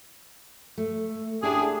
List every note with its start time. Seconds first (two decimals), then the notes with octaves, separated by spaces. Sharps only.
0.78 A3
1.43 C#4 D4 E4 G4 G#4